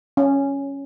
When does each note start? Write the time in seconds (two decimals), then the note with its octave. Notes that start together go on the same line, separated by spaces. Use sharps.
0.17 C#4